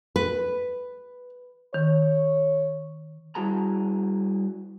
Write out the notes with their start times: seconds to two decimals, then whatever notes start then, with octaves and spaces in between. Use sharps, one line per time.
0.16 B4
1.74 D#3 C#5
3.35 G3 E4 F#4 G#4 A5 A#5